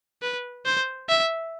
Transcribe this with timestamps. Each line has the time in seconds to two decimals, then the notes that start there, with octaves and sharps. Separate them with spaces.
0.22 B4
0.66 C5
1.09 E5